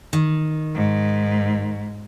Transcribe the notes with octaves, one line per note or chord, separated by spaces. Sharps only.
D#3
G#2